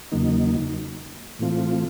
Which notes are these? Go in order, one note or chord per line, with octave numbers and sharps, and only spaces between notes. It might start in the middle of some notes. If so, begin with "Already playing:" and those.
E2 C#3 F#3 A#3 D#4
A2 E3 A3 C4 F4